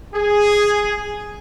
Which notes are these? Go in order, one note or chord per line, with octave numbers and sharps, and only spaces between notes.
G#4